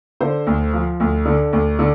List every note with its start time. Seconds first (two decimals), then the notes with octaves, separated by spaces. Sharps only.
0.21 D3 C5
0.47 D2
0.73 F3
1.00 D2
1.26 D3
1.53 D2
1.79 D3